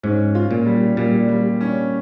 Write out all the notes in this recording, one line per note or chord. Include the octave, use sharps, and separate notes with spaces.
G#2 C#4
F4
A#2
G3
A#2 G3
G3
C#4